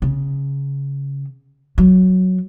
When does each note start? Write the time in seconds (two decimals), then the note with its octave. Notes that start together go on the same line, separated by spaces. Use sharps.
0.02 C#3
1.78 F#3